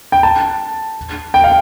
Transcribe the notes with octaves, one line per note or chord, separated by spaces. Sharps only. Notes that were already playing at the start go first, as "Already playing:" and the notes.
G5
A5
G5
F5